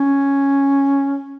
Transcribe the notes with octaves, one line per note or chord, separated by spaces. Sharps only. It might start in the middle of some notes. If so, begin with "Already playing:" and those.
Already playing: C#4